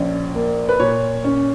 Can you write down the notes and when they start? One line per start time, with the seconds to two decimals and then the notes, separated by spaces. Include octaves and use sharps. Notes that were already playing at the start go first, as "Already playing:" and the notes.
Already playing: A#1 C#4
0.35 A#3
0.69 B4
0.80 A#2 C#5
1.24 C#4